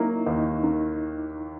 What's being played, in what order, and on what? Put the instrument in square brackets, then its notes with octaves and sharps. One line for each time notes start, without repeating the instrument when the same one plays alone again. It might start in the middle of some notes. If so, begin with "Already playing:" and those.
Already playing: [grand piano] F#3 A#3 [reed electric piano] D#4 E4
[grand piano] D#2 [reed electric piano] D#4
[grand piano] D#3